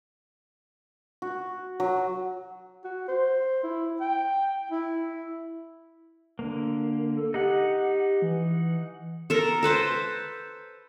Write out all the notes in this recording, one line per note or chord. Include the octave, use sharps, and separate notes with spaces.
F#4
F#3
F#4
C5
E4
G5
E4
D3 A#3
A4
D#4 G4 F#5
E3
A4 A#4
A4 B4 C5 A5